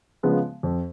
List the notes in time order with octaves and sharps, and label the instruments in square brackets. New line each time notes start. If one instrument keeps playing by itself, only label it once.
[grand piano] C#3 F3 G#3 B3
F2